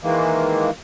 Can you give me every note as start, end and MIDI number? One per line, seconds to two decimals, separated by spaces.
0.03 0.70 51
0.03 0.70 52
0.03 0.70 56
0.03 0.70 58